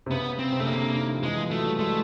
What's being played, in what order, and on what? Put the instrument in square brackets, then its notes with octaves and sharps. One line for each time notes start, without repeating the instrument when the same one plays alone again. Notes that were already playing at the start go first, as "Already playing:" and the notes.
[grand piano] C3
[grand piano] C#3 [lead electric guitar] B3
[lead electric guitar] C4
[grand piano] C3
[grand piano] C#3 [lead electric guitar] A3
[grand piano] D3 [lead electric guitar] A#3
[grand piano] D#3
F3
[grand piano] E3 [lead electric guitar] G#3
[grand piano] F3
[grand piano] F#3 [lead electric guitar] A3
[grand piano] G3
[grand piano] G#3 [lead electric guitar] A3